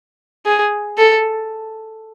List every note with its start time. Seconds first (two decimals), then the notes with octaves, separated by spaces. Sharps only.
0.46 G#4
0.98 A4